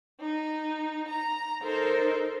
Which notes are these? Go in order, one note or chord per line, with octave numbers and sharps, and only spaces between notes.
D#4
A#5
D#4 A4 A#4 C5